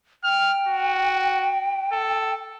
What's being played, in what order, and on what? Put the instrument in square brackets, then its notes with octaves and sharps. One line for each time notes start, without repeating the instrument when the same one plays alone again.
[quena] G5 [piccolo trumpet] F6
[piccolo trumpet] F#4
A4